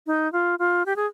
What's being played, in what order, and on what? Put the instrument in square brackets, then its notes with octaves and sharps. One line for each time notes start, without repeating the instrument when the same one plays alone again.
[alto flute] D#4
F4
F4
G4
G#4